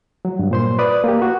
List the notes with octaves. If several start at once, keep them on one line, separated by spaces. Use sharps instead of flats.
F#3
G2
A#2 C5 C6
B4 D5 D#6
A#3 G4
F#4